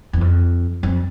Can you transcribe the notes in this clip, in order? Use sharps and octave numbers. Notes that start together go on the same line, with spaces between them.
E2
F2
F2